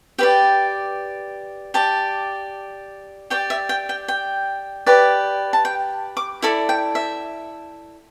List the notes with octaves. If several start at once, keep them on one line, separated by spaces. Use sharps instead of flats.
G4 B4 D5 G5
G4 D5 A5
G4 D5 G5
E5
G5
G5
G5
G4 B4 D5
A5
G5
D6
E4 A4 D5 B5
G5
E5